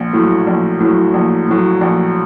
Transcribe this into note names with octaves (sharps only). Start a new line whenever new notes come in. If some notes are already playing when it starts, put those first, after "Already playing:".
Already playing: A#1
A2 F#3
A#1
A2 F#3
A#1
A2 F#3
A#1